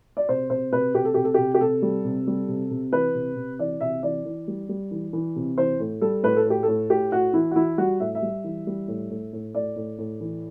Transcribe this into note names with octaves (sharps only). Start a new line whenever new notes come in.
D5
C3 C5
C3 C5
C3 B4
C3 G4
A4
C3 G4
A4
C3 G4
G4
C3 A4
G3
C3
G3
C3
C3
E3 B4
C3
C3
E3 D5
C3 E5
E3 D5
E3
G3
G3
E3
E3
C3
E3 C5
A2
G3 A4
A2 B4
A4
A2 G4
A2 A4
A2 G4
A2 F#4
E3 E4
F#4
E3 E4
G3 F#4
A2 E5
E5
G3
E3
G3
A2
A2
A2
A2 D5
A2
A2
E3